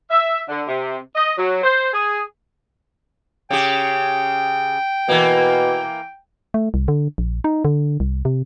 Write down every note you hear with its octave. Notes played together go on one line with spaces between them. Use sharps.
E5
D3
C3
D#5
F#3
C5
G#4
C#3 G4 G5
B2 E3 A#3
A3
C2
D3
A#1
D#4
D3
C2
C3